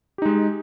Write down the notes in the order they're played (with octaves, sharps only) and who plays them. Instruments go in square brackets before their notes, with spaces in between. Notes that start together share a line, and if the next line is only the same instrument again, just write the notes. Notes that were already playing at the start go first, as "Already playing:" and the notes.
[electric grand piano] G4
D#4
G#3